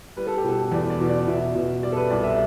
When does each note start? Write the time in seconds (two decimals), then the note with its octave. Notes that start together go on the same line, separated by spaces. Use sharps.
0.17 G3 B4
0.27 A4
0.38 G4
0.44 B2 A4
0.71 E2 D5
0.90 D5
1.00 B2
1.09 D5
1.27 B2 E5
1.55 B2
1.83 G3 D5
1.92 A4
1.96 B4
2.10 C2 D5
2.24 E5